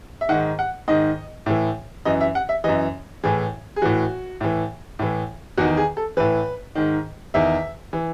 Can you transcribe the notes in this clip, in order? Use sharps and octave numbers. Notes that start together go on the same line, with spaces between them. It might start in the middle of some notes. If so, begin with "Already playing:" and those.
E5
G#2 D#3 F#5
F#5
G#2 D#3 D#5
A2 E3
F#2 E3 D#5
E5
F#5
E5
F#2 E3 D#5
A2 E3 G#4
G#4
A2 E3 F#4
A2 E3
A2 E3
E2 D#3 F#4
G#4
A4
A2 E3 B4
G#2 D#3
E2 D#3 E5
E3